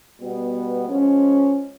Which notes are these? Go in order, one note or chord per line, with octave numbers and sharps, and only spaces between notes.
B2 G3 B3
F3 G#3 C#4